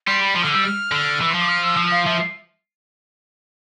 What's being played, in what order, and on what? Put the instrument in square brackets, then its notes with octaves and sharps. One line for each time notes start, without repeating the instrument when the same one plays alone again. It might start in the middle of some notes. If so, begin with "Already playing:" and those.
[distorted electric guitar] G3 [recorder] C6
[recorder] B5
[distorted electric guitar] F3 [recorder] C6
[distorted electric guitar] D3 [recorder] F6
[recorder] E6
[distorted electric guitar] G3
[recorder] F6
[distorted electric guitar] D3
[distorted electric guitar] E3 [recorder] E6
[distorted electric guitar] F3 [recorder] C6
[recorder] D6
F6
E6
[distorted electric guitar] F3
[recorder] F5
[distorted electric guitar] F3 [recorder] E5